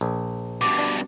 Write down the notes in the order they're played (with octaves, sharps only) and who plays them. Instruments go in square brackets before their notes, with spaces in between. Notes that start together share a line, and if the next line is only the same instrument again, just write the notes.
[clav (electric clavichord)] A#1
[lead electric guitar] G2 B2 [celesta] D6
[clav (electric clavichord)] D4